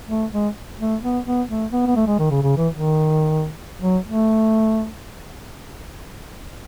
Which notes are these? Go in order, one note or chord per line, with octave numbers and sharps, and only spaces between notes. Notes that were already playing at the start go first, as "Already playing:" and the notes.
A3
G#3
A3
B3
B3
A3
B3
B3
A3
G#3
D#3
C#3
C#3
E3
D#3
F#3
A3